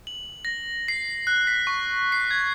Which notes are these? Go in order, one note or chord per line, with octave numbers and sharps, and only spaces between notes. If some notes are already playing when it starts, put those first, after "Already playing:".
F#7
A#6
C7
F#6
B6
C#6
C7
G#6